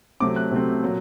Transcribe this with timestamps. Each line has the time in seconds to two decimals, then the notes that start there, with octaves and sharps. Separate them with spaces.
0.20 C3 F#3 A3 C4 D6
0.36 F#6
0.51 C3 F#3 A3 C4
0.82 A#2 F#3